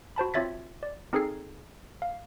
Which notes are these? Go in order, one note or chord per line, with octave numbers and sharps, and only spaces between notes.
F#4 C5 A5 B5
C4 F4 C#5 E5 A6 B6
D5
C4 D#4 G#4 A4 G#6 C7
F5